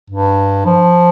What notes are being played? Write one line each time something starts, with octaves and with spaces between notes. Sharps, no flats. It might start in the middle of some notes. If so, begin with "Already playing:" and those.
G2
F3